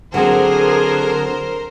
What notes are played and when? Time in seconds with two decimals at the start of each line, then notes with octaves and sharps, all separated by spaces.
0.14 D3 F#3 C4 G#4 A#4 C5